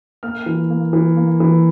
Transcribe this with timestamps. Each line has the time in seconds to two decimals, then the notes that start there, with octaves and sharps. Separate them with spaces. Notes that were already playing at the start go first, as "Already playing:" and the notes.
0.23 A#3 F6
0.46 E3
0.70 A#3
0.93 E3
1.17 A#3
1.40 E3